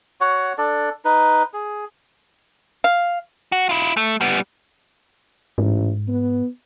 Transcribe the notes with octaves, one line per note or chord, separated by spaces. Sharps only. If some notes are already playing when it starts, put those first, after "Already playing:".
F#4 C#5 F#5
D4 A4 D5
D#4 B4
G#4
F5
F#4
E4 F4
A3
G3 B3
A1 G#2
B3